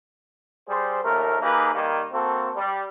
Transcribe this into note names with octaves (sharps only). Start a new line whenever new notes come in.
G3 G#4 C5
A#1 D#2 A3 A#4
A#3 D#4 G4 G#4 B4
D#3 G3 A#3
A#3 C4 F#4 A4
G3